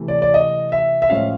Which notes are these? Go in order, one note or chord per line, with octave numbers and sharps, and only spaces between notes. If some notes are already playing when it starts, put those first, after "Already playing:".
Already playing: C3 E3 A3
D5
D5
D#5
E5
E5
A2 F3 G#3 C#4 F5